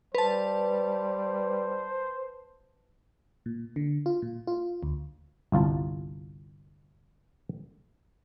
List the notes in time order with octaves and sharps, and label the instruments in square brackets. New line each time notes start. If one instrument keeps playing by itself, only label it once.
[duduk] G3 [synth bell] B4 A5 [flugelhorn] C5
[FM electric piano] A#2
D3
F4
A#2
F4
D2
[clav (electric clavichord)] G1 C2 F4 A5